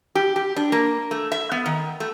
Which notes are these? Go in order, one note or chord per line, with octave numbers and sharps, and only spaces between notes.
G4
G4
D4
A#3
A3
E5
B3
D#3
A3